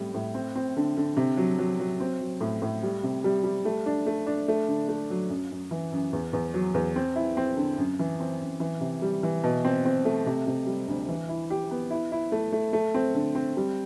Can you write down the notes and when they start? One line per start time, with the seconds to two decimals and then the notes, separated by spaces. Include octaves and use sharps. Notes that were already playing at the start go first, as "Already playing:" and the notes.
Already playing: A2 G3 C4
0.14 A2
0.34 C4
0.55 C4
0.77 D3
0.97 D3
1.17 C3
1.37 F#3
1.59 F#3
1.80 F#3
2.00 C4
2.21 F#3
2.41 A2
2.62 A2
2.83 G3
3.03 C3
3.24 G3
3.44 G3
3.65 A3
3.86 D4
4.06 A3
4.26 D4
4.48 A3
4.68 D3
4.89 A3
5.10 F#3
5.30 F#2
5.51 F#2
5.71 E3
5.92 F#2
6.13 E2
6.33 E2
6.54 F#3
6.74 E2
6.96 C4
7.16 E4
7.37 C4
7.57 D3
7.78 F#2
7.99 E3
8.20 C4
8.41 F#2
8.60 E3
8.81 C3
9.02 G3
9.23 E3
9.43 B2
9.64 C4
9.85 C4
10.05 A3
10.26 C3
10.47 C3
10.67 G3
10.88 D2
11.09 E3
11.29 E4
11.50 G4
11.71 B3
11.90 E4
12.12 E4
12.32 A3
12.52 A3
12.73 A3
12.94 C4
13.15 D3
13.35 C4
13.57 G3